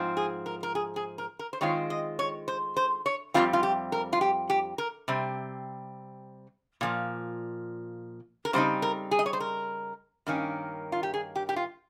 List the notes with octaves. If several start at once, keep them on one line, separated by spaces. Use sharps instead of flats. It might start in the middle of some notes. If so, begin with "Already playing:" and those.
Already playing: G#2 F3 C4
G#4
A#4
A#4
G#4
G#4
A#4
A#4
C5
D#3 G#3 C4 F4 C#5
D#5
C#5
C5
C5
C#5
F2 C#3 G3 C4 F4
F4
G4
A#4
F4
G4
G4
A#4
C3 G3 C4
A#2 F3 A#3
A#4
C#3 G3 C4 D#4 C5
A#4
G#4
D#5
C#5
C5
A#4
G2 D#3 A#3 C#4
F4
G4
G#4
G4
G4
F4